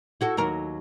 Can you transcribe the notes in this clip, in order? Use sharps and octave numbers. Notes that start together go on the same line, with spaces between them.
E4 F#4 A4
D#2 F#3 A#4